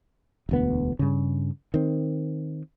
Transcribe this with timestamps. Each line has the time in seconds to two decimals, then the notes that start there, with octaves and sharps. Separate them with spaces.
0.49 E1 D2 B3
0.99 G2 C#3
1.74 D#3 C4